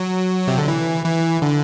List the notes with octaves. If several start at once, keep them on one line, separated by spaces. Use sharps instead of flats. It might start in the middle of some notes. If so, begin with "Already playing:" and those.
Already playing: F#3
C3
D3
E3
E3
D3